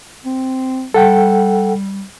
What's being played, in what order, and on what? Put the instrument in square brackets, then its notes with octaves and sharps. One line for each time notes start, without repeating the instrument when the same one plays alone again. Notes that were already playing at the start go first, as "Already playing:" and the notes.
[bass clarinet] C4
[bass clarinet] G3 [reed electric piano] A4 F#5 G5